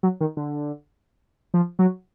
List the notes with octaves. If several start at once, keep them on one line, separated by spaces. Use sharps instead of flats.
F#3
D#3
D3
F3
F#3